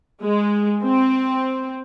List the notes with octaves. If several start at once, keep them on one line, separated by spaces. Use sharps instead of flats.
G#3
C4